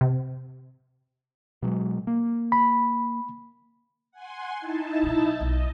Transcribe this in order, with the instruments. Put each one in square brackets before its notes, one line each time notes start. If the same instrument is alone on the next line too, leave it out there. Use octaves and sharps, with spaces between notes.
[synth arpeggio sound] C3
[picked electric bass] B2 F#3 G#3
A#3
[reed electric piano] B5
[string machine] F#5 G#5 C6
D#4 E4 A5
[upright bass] B2 F#3
[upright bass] B1 [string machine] D#5